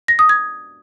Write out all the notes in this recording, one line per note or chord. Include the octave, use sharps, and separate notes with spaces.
A#6
D#6
G#6